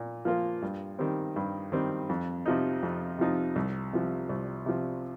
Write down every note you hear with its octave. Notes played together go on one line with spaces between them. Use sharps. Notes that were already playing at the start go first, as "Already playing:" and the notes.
Already playing: A#2
F3 A#3 F4 A#4
G2
D#3 G3 C4
G2
D#3 G3 C4
F2
C3 F3 D#4
F2
C3 F3 D#4
C2
C3 F3
C2
C3 F3